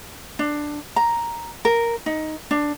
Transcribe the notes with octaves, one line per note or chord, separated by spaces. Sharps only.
D4
A#5
A#4
D#4
D4